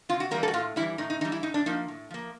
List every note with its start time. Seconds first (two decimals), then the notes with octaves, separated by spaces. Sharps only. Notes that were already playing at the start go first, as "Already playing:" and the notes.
0.09 C3 F4
0.20 F#4
0.31 E3 G3 A#3 A#4
0.43 A4
0.48 F#4
0.54 A2 F4
0.76 E3 G3 E4
0.98 A2 D#4
1.10 D#4
1.21 E3 G3 D#4
1.32 E4
1.43 A2 D#4
1.54 D4
1.66 F3 A#3 D#4
1.88 A2
2.11 F3 A#3